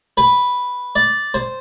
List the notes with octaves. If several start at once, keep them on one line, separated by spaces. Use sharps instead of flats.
B4
D5
C5